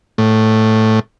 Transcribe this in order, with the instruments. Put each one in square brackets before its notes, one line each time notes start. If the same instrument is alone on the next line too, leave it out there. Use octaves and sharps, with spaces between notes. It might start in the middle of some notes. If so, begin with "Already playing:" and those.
[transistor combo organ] A2